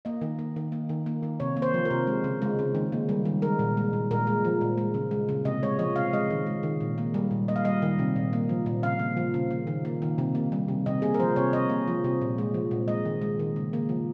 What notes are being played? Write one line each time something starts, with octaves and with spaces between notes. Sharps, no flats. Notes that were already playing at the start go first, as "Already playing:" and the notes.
A#3 D#5
D#3
A#3
D#3
A#3
D#3
A#3
D#3
C3 C#5
A#3
C5
F3
A#4
C3
G#3
C#3
G#3
C#3
D#3
A#3
G3
D#3
G#3 A#4
A#2
G#3
A#2
A#2 A#4
G#3
F3
A#2
G#3
C#3
G#3
C#3
C3 D#5
G#3 C#5
F3 D#5
C3 F5
G#3 D#5
D#3
G#3
D#3
A#2
A#3
G3
A#2
A#3 D#5
F5
G3 D#5
D#3
C3
A#2
A#3
F3
A#2
C#3 F5
A#3
F3
C#3
A#3
D#3
A#3
D#3
C3
A#3
G3
C3
C3 D#5
A#3 G#4
A#4
F3 C5
C3 C#5
C3 D#5
A#3
F3
C3
A#2
G#3
F3
A#2
G#3 D#5
D#3
G#3
D#3
C#3
A#3
F3